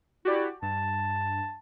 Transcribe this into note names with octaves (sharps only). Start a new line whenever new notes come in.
E4 F#4 G4 D5
G2 A5